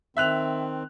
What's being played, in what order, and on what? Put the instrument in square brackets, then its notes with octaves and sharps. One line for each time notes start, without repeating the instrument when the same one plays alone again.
[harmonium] D#3 C4 [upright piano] E5 F#6 F7